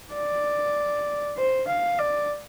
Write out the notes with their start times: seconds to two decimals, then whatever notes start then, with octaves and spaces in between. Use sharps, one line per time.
0.14 D5
1.38 C5
1.68 F5
1.99 D5